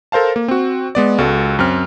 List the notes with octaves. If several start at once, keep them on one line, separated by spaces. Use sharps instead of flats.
A4 A#4 C5 F5 A5
A#3
C4 F#4
G#3 B3 D5
C#2 F#4 A4
F#2 C4 F6